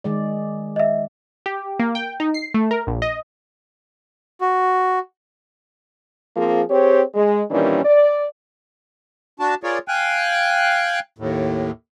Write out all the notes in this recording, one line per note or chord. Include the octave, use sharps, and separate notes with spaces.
D#3 G#3 D5
D#5 E5
G4
A#3
G5
D#4
C7
A3
A#4
A#1
D#5
F#4
F3 A#3 C4 F4 G#4
C4 G4 G#4 C5 C#5
G#3
A#2 D#3 E3 G3 C#4 D4
D5
D4 F#4 A5
F4 G#4 A#4 C#5 D5
F5 G5 G#5 F#6
D#2 A2